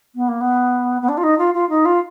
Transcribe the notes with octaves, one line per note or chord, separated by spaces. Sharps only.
B3
A#3
B3
B3
D4
F4
D#4
F4
F4
D#4
F4